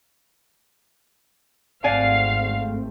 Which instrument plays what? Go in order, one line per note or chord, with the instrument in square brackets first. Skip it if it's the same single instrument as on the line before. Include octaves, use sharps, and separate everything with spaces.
[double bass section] G#1 A3 C4 [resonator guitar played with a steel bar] D5 F#5 G#5 [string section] F5